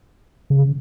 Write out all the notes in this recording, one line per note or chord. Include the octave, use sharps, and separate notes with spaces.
C#3